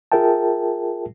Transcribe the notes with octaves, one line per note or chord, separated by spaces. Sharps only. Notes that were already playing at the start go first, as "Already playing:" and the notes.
F4 G#4 A#4 E5 G5 A5